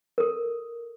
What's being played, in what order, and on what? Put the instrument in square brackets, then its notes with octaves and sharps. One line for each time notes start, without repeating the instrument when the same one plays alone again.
[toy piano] A4 A#4